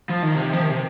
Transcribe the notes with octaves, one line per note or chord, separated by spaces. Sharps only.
F3
D#3
C3
F3
D#3
C3